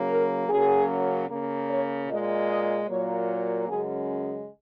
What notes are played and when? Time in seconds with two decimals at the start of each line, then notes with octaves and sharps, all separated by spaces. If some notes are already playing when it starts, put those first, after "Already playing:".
Already playing: C#3 F#3 A#3
0.10 A#4
0.49 F#2 C#3 F#3 A#3 G#4
1.29 C#3 A#3
1.70 C#5
2.09 A#2 G#3 D#5
2.50 D#5
2.89 A#2 F#3 A#3 C#5
3.29 A#4
3.68 F#2 C#3 G#3 G#4